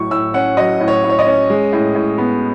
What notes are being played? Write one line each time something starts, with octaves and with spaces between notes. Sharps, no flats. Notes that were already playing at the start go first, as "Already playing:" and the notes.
Already playing: A2 F#3 C#6
A2 E6
C#4 F#5
F#3 D#5
A2
C#5
A2
C#5
D#5
C#4
G#3
A2
A2
B3